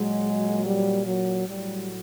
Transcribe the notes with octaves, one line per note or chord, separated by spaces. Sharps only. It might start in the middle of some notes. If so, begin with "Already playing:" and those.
Already playing: A#2 F#3 G#3
G3
F#3
A2 F#3 G3